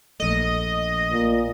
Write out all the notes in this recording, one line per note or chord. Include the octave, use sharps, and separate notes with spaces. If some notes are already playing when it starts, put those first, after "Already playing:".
A#1 A3 D#5
A#2